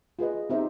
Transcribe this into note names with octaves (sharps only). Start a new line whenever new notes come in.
F4 G#4 B4 D#5
C4 D#4 G4 C5 E5